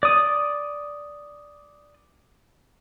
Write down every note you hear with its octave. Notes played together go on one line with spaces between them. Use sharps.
D5 D#6